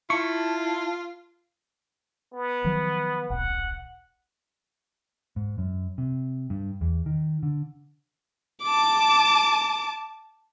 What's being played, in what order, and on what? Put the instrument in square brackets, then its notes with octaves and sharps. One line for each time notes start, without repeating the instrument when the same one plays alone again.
[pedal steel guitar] E4 [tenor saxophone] F4 [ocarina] A5 [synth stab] C#6
[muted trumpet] B3
[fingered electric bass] D#3 F3 F#3
[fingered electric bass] D1 A#1 [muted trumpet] F#5
[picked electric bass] G#2
F#2
C3
G2
E2
D#3
D3
[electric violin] A5 D6